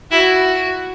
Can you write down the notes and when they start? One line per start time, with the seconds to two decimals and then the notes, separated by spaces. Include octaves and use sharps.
0.11 E4 F#4